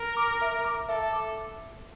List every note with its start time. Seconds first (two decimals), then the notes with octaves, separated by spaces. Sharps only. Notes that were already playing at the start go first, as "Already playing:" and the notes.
Already playing: A#4
0.17 D6
0.41 E5
0.65 D6
0.89 A4 E5
1.13 D6